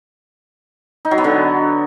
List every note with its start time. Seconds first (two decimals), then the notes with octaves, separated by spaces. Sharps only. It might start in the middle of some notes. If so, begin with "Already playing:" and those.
1.05 D#4
1.11 F#3
1.18 B3
1.24 D3